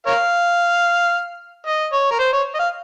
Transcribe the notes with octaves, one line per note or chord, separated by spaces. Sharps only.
A#4 C#5 F5
D#5
C#5
A#4
C5
C#5
D#5
F5